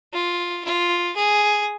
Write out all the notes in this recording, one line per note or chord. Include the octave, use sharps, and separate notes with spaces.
F4
F4
G#4